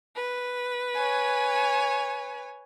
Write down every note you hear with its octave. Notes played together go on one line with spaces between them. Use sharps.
B4
C#5 G#5